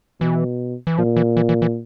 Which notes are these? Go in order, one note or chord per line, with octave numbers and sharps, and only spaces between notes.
B2 E3
E3
A#2 F3
E3
E3
E3
E3